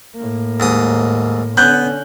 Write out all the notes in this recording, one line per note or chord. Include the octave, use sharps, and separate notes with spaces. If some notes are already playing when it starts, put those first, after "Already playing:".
A2 A#3
D#2 G#2 D#6
D3 B3 C#4 F#6 G6